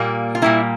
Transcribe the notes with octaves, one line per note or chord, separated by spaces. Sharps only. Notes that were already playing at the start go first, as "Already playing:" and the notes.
Already playing: A#2 G3 A#3
F4
A#2 G3 A#3 E4